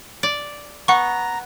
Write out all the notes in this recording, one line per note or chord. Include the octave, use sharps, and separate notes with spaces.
D5
B3 F#5 A#5 C#6